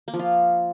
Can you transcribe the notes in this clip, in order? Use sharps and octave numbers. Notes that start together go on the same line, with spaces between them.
A#3
F3
F4